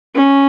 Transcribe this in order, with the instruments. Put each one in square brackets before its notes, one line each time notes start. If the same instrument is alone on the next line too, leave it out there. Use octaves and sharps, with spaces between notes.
[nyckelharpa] C#4